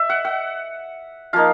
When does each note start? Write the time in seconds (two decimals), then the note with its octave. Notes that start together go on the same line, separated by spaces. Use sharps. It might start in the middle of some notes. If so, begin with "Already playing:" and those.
Already playing: E5
0.10 F#5
0.25 F#5
1.33 F3 A#3 D#4 F5